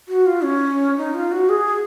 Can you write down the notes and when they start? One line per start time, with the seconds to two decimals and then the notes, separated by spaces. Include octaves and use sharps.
0.09 F#4
0.26 F4
0.44 C#4
0.97 D#4
1.14 F4
1.32 F#4
1.49 G#4